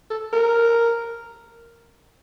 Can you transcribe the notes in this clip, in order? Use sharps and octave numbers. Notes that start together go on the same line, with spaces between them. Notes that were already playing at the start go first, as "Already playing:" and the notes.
A4
A#4